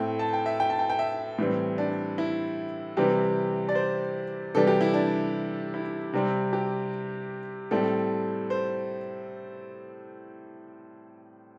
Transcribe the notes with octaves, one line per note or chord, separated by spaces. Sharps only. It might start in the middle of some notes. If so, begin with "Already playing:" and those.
Already playing: A2 A3 C4 G5
A5
G5
E5
G5
A5
G5
G5
E5
A2 E3 G3 C4
D4
E4
C3 E3 G3 C4 G4
D5
C5
C3 E3 G3 A4
G4
E4
D4
E4
C3 G3 C4
G4
A2 G3 C4 A4
C5